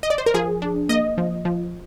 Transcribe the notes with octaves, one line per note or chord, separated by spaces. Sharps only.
D#5
D5
C5
A#4
F3 G#4
D4
A#3 D#5
F3
F3